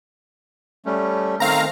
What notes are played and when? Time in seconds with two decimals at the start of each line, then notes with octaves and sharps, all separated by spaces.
0.86 G3 A3 C#4
1.40 D#3 A3 C4 F5 A#5